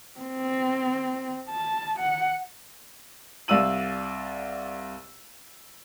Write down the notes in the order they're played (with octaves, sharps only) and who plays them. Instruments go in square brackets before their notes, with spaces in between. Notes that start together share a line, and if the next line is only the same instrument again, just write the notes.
[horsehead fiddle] C4
A5
F#5
[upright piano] C2 D5 F5 E6 D#7 F#7